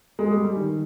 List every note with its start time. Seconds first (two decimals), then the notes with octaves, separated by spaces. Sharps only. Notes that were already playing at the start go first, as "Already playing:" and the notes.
0.19 G#3
0.31 G3
0.44 G3
0.56 D#3